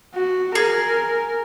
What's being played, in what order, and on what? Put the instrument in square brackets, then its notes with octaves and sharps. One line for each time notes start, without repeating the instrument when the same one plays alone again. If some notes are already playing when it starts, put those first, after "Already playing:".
[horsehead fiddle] F#4
[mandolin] G#4 [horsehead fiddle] A#4